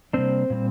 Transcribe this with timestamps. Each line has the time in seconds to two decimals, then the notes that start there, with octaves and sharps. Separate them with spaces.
0.13 C3 G3 A#3 C4 D4 C5
0.50 A#2 G3 C4